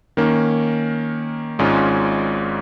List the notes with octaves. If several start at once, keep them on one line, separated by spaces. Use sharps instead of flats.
D#3 A#3 C#4
G#1 G#2 G#3 C#4 F4